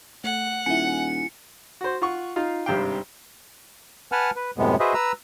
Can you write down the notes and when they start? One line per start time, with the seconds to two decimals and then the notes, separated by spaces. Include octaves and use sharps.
0.24 A3 F#5
0.66 D#1 E4 G#5 C#7
1.81 F#4 C5
2.02 F4 F#5 C#6
2.36 D#4 F4 F5
2.66 G#1 G2 C3 G4 F5 G5
4.12 B4 F#5 G#5 A5 F6
4.36 B4
4.58 F#2 A2 C3 G#3 B3
4.80 F#4 G#4 B4 C5 D#5 E5
4.94 B4 A#5 E6